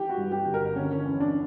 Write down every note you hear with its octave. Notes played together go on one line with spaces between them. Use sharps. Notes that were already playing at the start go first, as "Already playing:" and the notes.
Already playing: E3 G4
F#4
G2
G4
G1
A#4
D3 C#4
C#4
E2
D4